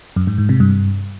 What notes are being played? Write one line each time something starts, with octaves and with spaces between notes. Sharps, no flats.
F#2
G#2
G#2
C3
G2